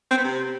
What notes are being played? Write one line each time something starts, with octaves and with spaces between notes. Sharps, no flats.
C4
B3
C3